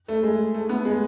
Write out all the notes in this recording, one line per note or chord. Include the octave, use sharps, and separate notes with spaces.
A3
G#3
A3
B3
G#3